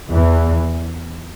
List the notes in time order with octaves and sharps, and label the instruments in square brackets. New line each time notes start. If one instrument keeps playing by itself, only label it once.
[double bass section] E2 E3